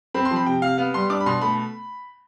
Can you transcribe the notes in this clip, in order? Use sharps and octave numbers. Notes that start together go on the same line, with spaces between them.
C4 B5
C6
F3 B5
C3 G5
C3 F5
B3 F5
G3 C6
D4 D6
B5
B2 C6
A3 B5